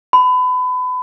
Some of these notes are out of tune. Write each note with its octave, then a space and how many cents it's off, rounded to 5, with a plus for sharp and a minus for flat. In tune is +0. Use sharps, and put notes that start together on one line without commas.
B5 +30